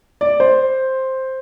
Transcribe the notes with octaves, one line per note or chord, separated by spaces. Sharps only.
D5
C5